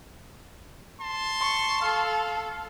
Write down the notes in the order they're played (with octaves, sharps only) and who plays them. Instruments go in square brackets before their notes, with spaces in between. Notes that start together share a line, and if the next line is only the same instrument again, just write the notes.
[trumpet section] A5 C6
[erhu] C#6
[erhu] A4 [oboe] F5